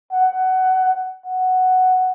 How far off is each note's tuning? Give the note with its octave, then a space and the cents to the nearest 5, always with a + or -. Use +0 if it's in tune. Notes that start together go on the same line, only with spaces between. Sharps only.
F#5 +20
F#5 +5